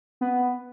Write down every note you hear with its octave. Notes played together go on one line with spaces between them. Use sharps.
B3